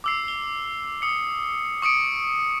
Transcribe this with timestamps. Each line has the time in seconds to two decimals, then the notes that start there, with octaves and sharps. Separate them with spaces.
0.04 D6 E6 C7
0.28 G7
1.02 D#6 C#7
1.82 C#6 D#6 C#7 D7